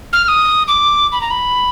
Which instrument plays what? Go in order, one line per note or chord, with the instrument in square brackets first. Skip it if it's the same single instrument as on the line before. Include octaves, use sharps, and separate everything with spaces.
[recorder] F6
F6
D#6
D6
B5
A#5
B5